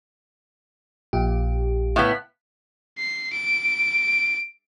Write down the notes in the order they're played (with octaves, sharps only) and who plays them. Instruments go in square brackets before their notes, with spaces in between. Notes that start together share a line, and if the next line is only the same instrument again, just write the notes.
[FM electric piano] A#1 A#2 G4
[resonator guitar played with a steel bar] A2 B3 [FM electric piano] F5 F#6 B6
[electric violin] C7
D7